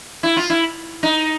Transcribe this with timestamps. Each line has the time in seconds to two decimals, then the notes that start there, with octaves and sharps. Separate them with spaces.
0.23 E4
0.37 F4
0.50 E4
1.03 D#4